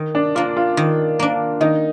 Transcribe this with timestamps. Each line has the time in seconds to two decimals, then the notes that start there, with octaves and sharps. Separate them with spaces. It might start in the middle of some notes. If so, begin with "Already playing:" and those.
Already playing: D#3
0.15 D4
0.35 A#3 D4 F4
0.57 F4
0.77 D#3
1.19 A#3 D4
1.61 D#3 D#4